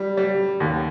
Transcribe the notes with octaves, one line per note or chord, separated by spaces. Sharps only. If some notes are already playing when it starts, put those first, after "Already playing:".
Already playing: G3
G3
D#2